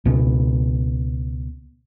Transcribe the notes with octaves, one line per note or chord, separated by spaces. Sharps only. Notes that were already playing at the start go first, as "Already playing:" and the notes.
C#2 B2